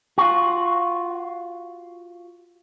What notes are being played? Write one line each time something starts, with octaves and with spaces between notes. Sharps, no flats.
F4 F#4